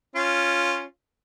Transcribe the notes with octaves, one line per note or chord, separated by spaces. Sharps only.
C#4 F4